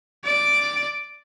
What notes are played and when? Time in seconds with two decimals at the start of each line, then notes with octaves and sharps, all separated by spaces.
0.25 D5 D7